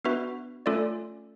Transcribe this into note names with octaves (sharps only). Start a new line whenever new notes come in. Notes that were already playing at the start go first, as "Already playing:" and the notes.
B3 D4 F#4 B4 E5
A3 C#4 F4 A4 D5